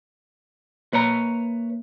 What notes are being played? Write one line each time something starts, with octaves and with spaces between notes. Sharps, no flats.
A#3 B4 C#5 A#5